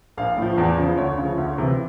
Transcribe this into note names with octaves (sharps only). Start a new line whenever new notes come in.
A#1 F5
A2 F3
E2
C#3 F3
D2 C#5
C#3 F3
D2
C3 E3